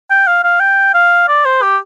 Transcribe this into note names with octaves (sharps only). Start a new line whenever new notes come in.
G5
F5
F5
G5
F5
D5
C5
G4